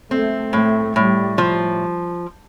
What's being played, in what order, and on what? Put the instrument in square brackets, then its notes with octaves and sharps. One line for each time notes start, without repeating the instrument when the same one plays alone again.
[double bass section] A3 [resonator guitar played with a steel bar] C4
[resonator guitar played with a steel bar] A2 [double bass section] A3
[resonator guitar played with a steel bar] A2 [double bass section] G3
[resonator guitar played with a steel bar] F3